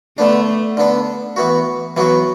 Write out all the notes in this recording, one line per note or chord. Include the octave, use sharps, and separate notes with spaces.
D3 A3 B3 D4
D3 B3 D4
E3 B3 F#4
E3 F#3 B3 F#4